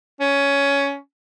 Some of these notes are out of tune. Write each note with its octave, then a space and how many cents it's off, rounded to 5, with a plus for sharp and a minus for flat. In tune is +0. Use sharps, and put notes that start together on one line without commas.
C#4 +15